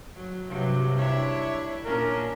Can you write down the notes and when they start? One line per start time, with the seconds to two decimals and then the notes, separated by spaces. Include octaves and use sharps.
0.16 F#3
0.48 G2 C3 F#3
0.97 D4 E4 C#5
1.85 A#2 C#4 D4 A#4